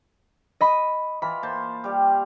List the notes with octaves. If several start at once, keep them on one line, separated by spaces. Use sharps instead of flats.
D#5 B5
E3 F4 B5
A#3 C5 A5
G3 G4